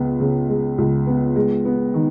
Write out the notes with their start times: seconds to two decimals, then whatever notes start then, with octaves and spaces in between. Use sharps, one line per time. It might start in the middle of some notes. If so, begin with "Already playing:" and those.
Already playing: C#2 B3
0.20 C#3
0.49 G#3
0.78 C#2
1.07 B3
1.36 G#3
1.65 B3
1.94 D#3